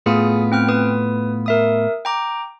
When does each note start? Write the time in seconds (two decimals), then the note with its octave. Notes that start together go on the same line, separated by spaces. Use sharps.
0.06 A2 B3 F4 G#4 D#6
0.52 C4 G5 F6
0.68 B4 D#6
1.46 A#4 E5 D#6
2.05 G5 A#5 D6